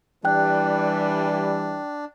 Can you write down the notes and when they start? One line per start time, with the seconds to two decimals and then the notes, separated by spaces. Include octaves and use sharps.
0.25 E3 G3 D4 G5 F#6